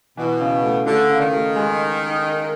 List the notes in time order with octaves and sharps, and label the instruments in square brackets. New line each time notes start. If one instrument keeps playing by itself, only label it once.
[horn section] B2 [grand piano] E3
[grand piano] C#3
A3
[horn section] D3 [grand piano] A3
[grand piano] C#3
[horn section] D#3
[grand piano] A3
G#3